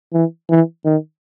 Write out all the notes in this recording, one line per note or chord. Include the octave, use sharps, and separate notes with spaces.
E3
E3
D#3